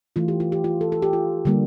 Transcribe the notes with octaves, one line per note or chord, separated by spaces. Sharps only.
E3 A3 F4
G4
F4
G4
F4
A4
A4
G4
F4
D3 G3 A#3